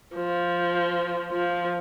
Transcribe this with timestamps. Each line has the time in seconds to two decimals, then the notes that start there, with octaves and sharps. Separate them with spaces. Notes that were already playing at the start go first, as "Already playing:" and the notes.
0.15 F3
1.32 F3